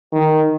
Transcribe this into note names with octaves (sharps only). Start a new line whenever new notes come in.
D#3